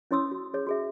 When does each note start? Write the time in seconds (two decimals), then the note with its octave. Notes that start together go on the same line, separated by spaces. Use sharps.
0.11 C#4 E4 C#5 C6 D#6 E6
0.32 F#4
0.54 G#4 C#5
0.67 F#4 G#4 E5